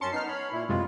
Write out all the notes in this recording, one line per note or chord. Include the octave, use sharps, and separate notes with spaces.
F#2 C#4 A5 C6 C#7
B3 D#4 F6 C7
C#5 B5
A#2 E4
F#2 C3 G#3 F4